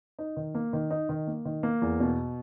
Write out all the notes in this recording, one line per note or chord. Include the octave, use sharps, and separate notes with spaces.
D#4
D#3
A#3
D#3
D#4
D#3
A#3
D#3
A#3
E2
B2